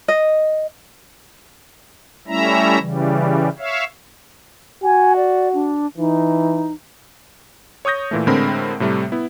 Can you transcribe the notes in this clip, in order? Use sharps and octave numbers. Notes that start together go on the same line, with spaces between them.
D#5
G3 A3 C#4 E4 E5 A#5
C#3 E3 G3
C#5 E5 F5
F#4 G#5
D5
D4
E3 D#4
C#5 C#6 D#6 G6 A#6
A#2 E3 A3
A2 D3 G#3 C4 A#4 B5
A2 C3 G3 A3
B3 E4